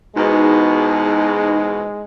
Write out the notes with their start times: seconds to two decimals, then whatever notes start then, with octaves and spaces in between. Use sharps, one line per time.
0.16 E2 G#2 B2 G#3 D#4